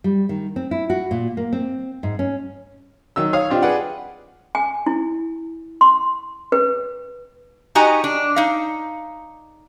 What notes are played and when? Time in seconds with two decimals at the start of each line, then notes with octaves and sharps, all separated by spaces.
0.04 G3
0.29 D#3
0.56 C4
0.71 E4
0.90 F#4
1.11 A#2
1.37 A#3
1.53 C4
2.03 G#2
2.19 C#4
3.16 D#3 F#3 E6
3.33 C#5 F5 D#6
3.50 C4 D4 D#4 F4 G4
3.62 G#4 B4 D5 F#5 G5
4.55 G#5
4.86 E4
5.81 C6
6.52 B4
7.75 D#4 F#4 G4 D#5 G#5 A#5
8.04 D4
8.36 D#4 F5